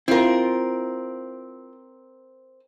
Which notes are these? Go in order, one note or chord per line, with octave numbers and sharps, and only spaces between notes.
C4 E4 F4 A#4